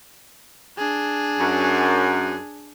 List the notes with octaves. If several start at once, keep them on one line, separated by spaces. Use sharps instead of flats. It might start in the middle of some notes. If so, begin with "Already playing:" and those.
D4 G#4
F#2